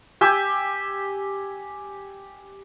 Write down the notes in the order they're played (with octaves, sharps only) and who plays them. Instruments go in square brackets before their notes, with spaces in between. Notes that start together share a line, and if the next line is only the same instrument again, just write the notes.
[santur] G4 G5 G#5 E6